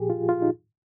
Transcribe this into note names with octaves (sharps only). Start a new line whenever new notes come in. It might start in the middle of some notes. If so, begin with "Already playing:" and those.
Already playing: A#2 F3 G4 G#4
F4
F4
D#4